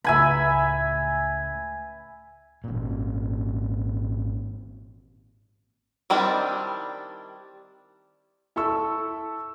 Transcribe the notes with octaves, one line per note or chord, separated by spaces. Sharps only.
C#2 A2 E5 G#5 B5
G#1 A#2
D#3 G3 C4 D4 E4
E4 A4 A5 C#6 E6